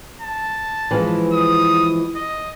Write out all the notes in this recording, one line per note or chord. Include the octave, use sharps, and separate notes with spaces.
A5
E3 F3 G#3
D#6
D#5